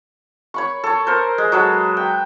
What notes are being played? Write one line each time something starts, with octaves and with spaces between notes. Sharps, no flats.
C#5 B5 C#6
A4 C#5
A#4 C5
G#3
F#3 G#3 A4 B4
G5